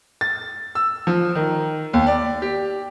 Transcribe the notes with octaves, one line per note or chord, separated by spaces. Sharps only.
A6
E6
F3
D#3
D#2
D5
G4